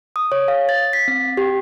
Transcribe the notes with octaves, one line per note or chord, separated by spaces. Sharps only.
D#6
C#5
F5
A6
B6
C4
G4